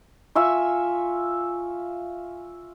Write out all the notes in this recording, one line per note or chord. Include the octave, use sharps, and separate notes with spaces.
F4 E5 G#5 C#6